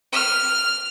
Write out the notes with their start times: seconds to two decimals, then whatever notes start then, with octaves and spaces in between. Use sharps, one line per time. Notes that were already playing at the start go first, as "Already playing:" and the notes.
0.13 F6